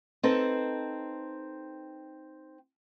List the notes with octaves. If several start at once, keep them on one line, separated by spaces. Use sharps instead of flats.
C4 D#4 A4 B4